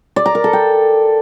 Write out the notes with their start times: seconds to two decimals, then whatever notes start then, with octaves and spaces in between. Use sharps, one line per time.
0.16 D5
0.26 A#5
0.35 A#4
0.44 A4
0.53 G5